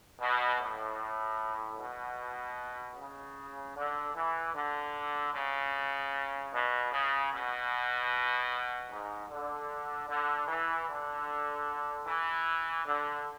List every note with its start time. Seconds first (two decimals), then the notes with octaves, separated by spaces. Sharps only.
0.20 B2
0.59 A2
1.78 B2
2.96 C#3
3.76 D3
4.15 E3
4.54 D3
5.34 C#3
6.52 B2
6.91 C#3
7.31 B2
8.90 G#2
9.29 D3
10.09 D3
10.48 E3
10.88 D3
12.06 E3
12.86 D3